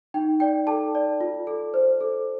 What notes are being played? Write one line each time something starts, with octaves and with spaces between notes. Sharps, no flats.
D#4 G5
D5 G5
A4 A5
D5
F4
A4
C5
A4